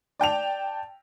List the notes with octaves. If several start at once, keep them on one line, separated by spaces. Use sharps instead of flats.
D5 G5 A5 F7